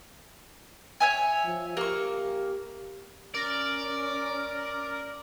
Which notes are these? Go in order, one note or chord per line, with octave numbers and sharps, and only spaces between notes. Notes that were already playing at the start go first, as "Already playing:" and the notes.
C#5 E5 G#5
F3
A#3 G4 C#6
C#4 A#4 D5